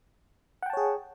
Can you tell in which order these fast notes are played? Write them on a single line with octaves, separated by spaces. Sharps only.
F#5 G5 A5 C#5 G#4